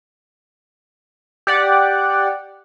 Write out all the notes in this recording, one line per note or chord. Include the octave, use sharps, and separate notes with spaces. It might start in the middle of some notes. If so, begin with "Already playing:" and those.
G4 D5 F#5